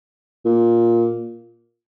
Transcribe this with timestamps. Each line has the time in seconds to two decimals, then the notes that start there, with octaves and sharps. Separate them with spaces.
0.46 A#2